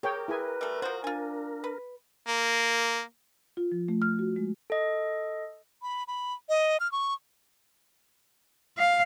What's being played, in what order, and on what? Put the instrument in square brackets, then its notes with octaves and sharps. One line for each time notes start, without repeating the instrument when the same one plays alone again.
[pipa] G4 [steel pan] G#4 C#5 G5 [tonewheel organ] A#4
[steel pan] E4 G#4 G#5 [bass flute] B4
[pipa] G3 A3
[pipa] F3 F#4 [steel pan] C5
[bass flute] D4 [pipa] F4 G#5
[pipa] B4
[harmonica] A#3
[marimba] F4
F3
A3
F6
F#4
G#3
[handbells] A4 D#5
[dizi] B5
B5
D#5
F6
C#6
[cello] F5